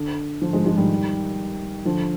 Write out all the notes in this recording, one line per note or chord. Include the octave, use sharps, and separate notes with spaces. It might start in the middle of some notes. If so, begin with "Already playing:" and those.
Already playing: D3
D3 F3
F3 G#3
F3 G#3
D#3 G3
D3 F3